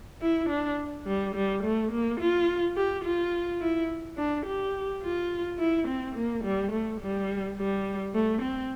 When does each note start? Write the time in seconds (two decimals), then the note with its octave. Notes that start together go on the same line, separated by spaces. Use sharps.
0.21 E4
0.50 D4
1.07 G3
1.35 G3
1.64 A3
1.92 A#3
2.20 F4
2.76 G4
3.04 F4
3.61 E4
4.17 D4
4.46 G4
5.03 F4
5.59 E4
5.88 C4
6.16 A#3
6.44 G3
6.72 A3
7.01 G3
7.57 G3
8.14 A3
8.42 C4